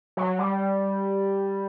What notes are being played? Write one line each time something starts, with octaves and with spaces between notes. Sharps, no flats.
F#3
G3